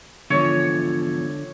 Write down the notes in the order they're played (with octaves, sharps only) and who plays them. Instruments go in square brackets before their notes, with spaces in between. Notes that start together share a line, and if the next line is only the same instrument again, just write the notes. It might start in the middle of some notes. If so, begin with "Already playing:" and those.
[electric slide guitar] E2 G#2 F3 [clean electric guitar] D3 [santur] C#5